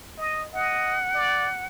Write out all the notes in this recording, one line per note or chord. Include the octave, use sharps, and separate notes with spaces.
D#5
D#5 F#5
D5